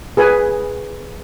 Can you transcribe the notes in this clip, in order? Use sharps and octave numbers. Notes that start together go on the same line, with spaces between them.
G#4 B4 G#5